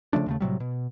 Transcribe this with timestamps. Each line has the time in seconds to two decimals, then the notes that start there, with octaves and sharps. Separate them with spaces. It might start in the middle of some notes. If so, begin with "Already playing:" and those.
0.13 C#3 F3 A3 D4
0.26 D#2 C#3 A3
0.40 A2 C3 F#3 G3
0.60 B2